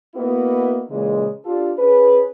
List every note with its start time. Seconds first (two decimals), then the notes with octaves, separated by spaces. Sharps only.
0.14 A#3 B3 D#4 E4 F#4
0.89 A#2 C#3 E3 G#3
1.44 D4 F4 G4 A4
1.78 C#4 G#4 B4